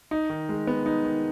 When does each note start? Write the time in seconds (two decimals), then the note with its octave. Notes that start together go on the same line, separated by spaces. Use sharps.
0.11 D#4
0.29 D#3
0.49 G#3
0.67 B3
0.86 D#4
1.04 D#3